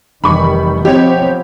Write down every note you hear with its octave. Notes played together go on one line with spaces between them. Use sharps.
F1 D#3 E3 G3 B5 C#6
F3 B3 C4 G4 C#5 D#5